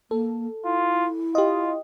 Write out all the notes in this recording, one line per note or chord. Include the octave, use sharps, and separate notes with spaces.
A#3 A4
E4 F4
F4 G4 D#5